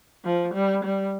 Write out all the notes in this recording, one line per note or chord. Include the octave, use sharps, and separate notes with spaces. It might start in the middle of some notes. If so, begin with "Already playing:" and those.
F3
G3
G3